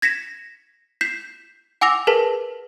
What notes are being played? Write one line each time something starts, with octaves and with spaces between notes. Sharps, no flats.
G#6 A#6 B6 C#7 E7
G6 B6 C7 E7
F#5 G#5 D6 E6 A#6 F7
G#4 A#4 B4 A5 B6